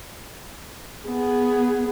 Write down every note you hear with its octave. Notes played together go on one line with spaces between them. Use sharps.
B3 G#4